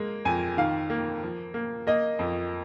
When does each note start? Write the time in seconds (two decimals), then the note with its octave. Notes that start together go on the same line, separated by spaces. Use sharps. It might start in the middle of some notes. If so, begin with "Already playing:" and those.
Already playing: G#3 A#3
0.25 F2 G#5
0.57 D#3 F5
0.90 A#3
1.23 F3
1.54 A#3
1.87 A#3 D#5
2.19 F2